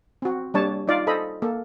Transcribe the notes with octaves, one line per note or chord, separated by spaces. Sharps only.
C4 F#4
G3 A#3 D4 C#5 A5
D#4 F4 D5 F5
A4 C5 D#5 B5
A#3 A4